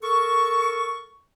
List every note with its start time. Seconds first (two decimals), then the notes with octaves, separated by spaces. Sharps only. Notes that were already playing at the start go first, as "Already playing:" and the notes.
0.03 A4 A#4 C#6